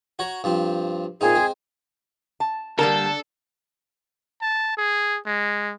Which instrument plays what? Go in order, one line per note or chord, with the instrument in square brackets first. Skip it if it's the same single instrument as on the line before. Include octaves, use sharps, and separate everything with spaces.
[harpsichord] F#4 C#5 A#5
G2 F3 C4
[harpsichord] A#2 C4 D#4 [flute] G#4
[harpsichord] G#3 C4
[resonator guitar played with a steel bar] A5
[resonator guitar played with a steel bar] D3 [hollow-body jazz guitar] G3 A#3 A#4 [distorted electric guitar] A4 [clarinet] A5
[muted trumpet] A5
G#4
G#3